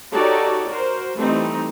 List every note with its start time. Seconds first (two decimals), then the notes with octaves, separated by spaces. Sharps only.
0.13 D#4 F#4 G4 A4 C#5 D5
0.69 F#4 A#4 C5
1.17 E3 G3 A3 C4 D#4